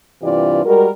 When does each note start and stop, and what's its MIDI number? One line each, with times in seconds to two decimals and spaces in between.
0.22 0.64 43
0.22 0.64 48
0.22 0.64 52
0.22 0.64 65
0.22 0.64 67
0.22 0.64 74
0.65 0.89 55
0.65 0.89 56
0.65 0.89 66
0.65 0.89 70